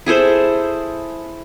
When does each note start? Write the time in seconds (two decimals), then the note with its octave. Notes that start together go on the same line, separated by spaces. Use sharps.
0.06 E4 G#4 A4 C5